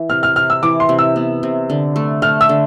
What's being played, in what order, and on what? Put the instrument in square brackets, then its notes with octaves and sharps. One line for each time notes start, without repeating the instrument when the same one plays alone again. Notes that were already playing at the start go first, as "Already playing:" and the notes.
Already playing: [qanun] E3
[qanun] C3 [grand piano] F6
[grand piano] F6
[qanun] C3 [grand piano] F6
[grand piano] E6
[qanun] E3 [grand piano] D6
[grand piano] C6
[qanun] C3
[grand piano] E6
[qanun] B3
C3
D3
A3
[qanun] A3 [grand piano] F6
[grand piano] E6
[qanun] D3